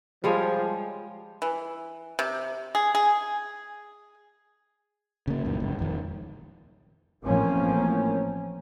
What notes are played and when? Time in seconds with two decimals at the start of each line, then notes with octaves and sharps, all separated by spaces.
0.24 F3 G3 G#3 C#5
1.42 E3
2.19 C3
2.75 G#4
2.95 G#4
5.27 C#3 A#3
5.44 C#2 F#2 A#2 D#3
5.60 F#1 G#2
5.79 D#1 F2 D#3
7.24 A1 A2 F3 A#3 C4 C#4